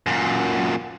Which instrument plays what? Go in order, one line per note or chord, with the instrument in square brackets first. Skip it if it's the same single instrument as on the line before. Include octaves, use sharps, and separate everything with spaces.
[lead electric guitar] F#2 A#2